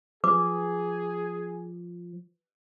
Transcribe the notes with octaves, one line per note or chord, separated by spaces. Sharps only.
F3 G#4 B4 D6